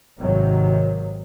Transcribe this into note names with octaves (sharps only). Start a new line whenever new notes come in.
G#1 C3 D#3 F#3